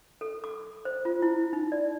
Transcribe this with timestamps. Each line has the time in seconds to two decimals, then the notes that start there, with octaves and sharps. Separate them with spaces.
0.21 A4
0.44 D6
0.85 C5
1.05 F4
1.22 E4
1.53 D#4
1.72 D5